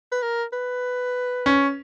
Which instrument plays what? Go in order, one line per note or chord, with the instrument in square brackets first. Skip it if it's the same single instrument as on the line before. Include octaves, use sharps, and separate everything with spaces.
[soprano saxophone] B4
A#4
B4
[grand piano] C#4